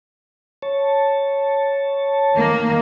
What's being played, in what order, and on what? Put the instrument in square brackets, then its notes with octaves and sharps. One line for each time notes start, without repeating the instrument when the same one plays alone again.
[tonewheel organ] C#5 A5
[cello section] D#3 A#3